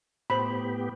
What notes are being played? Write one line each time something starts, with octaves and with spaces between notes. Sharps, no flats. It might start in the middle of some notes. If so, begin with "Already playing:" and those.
A2 B3 G4 C5 B5